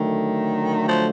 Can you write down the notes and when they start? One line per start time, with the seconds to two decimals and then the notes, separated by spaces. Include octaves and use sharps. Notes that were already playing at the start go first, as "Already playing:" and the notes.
Already playing: D3 D#3 F#3 A3
0.88 F3